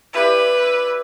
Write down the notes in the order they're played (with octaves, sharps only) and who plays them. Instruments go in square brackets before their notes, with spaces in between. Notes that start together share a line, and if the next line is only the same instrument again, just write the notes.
[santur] E4 G4 D5 [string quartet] B4